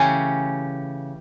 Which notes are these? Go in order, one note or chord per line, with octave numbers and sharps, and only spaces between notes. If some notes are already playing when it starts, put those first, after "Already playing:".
Already playing: C#3 E3 A3 C#4 G4